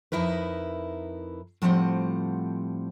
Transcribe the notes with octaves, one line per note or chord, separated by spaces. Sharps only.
F2 D#4 E4 A#4 B4
A2 F3 G3 C4 F#5